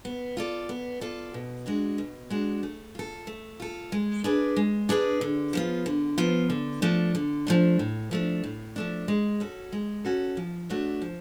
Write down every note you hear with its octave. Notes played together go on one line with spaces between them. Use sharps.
B3
F4 A4 D5
B3
F4 A4 D5
B2
G#3 D4 F#4
B2
G#3 D4 F#4
A3
F4 A4
A3
F4 A4
G#3
D4 G#4 B4 D5
G#3
D4 G#4 B4 D5
D3
F3 B3 F4
D3
F3 B3 F4
D3
F3 A3 D4
D3
F3 A3 D4
A2
F3 A3 D4
A2
F3 A3 D4
G#3
C#4 F#4 A4
G#3
C#4 F#4 A4
F3
A3 D4 F#4 C#5
F3